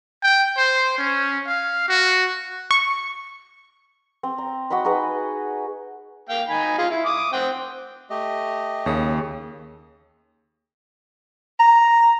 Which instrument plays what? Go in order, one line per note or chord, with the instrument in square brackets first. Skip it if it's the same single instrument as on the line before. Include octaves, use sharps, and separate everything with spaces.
[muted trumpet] G5
C5
C#4
F5
F#4
[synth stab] C#6
[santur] C4
A#5
F#4 D#5 F#5 B5
D#4 F#4 G#4 B4
[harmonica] A#3 F5 G5
D#4 G#5 B5
F4 G#4 G#5
E4
D6 D#6
C4 F#5 G5
[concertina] A3 G4 D#5
[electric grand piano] D#2 [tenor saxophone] C#3
[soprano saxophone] A#5